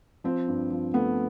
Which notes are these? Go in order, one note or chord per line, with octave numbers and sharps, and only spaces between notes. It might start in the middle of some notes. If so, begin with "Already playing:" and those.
F3 C4
G2
F3
A3 B3